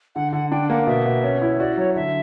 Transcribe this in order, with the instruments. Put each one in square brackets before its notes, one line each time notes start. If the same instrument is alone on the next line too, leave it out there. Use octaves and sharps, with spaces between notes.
[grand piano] D3 [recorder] F#5
[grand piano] D3 [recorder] F#5
[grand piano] D4 [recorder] G5
[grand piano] A#3 [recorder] F#5
[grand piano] B2 [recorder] E5
[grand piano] B2
C#4
E4
[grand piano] F#4 [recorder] D5
[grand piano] F#3 [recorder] C#5
[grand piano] D3 [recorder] E5